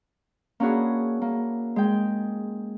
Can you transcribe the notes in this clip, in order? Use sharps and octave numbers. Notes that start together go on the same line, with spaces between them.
A#3 C#4 D4 E4 F#4 G#4
A#3
G#3 G5